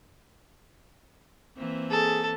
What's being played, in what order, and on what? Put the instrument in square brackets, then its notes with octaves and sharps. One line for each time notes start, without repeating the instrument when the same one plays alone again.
[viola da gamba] E3 A#3 C4
[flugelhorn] G#4 [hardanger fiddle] A4